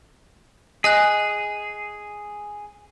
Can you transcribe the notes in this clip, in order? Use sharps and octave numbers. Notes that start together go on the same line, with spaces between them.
G#4 D#5 G#5 F#6